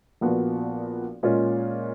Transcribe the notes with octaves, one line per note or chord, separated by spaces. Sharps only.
A#1 A#2 F3 B3 F#4
A#2 G#3 C#4 F4